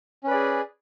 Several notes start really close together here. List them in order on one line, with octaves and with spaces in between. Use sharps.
C#4 B4 D5 G#4